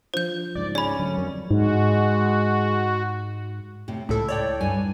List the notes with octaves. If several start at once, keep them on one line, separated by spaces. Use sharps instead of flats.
F3 D4 F4 C5 G6
C#2 G#2 D5
C#4 G#4 D5 B5
D3 F#3 A3
F2 F#3 A#4
G#2 G#3 F#4
A2 C3
C#2 A2 E4 A4
C#5 D5 G5
G2 G#5